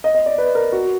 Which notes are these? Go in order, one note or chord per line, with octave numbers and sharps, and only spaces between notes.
D#5
D#5
D5
B4
A#4
F#4